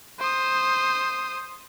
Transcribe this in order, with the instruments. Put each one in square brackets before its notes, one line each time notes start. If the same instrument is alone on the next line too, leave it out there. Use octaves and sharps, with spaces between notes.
[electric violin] C5 D#6